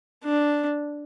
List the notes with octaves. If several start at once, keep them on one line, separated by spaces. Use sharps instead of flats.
D4